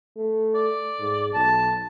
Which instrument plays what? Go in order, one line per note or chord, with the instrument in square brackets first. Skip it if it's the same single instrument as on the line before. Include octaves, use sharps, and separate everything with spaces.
[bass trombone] A3
[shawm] D5
[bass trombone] G#2
[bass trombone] B1 [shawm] A5